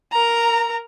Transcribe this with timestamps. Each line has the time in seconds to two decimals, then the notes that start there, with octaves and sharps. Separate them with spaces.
0.12 A#4 A#5